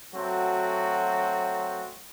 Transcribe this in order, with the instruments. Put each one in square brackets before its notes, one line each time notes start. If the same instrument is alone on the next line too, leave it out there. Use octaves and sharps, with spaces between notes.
[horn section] F#3 A3 C4 F#4